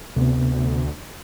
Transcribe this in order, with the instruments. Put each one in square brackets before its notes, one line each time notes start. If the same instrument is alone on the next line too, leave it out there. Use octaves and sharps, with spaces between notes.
[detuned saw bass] D2 [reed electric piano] C3 B3